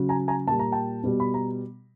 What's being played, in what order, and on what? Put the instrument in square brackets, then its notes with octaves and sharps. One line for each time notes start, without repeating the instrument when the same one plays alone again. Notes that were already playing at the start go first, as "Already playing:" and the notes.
Already playing: [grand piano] C#3 F#3
G#5 A#5
G#5 A#5
A#2 G3 A5
A#5
G5 A5
B2 G3
B5
A#5